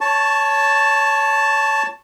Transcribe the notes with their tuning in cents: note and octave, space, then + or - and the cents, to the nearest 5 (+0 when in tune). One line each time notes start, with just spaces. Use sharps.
C#5 +20 A5 +0 C#6 -10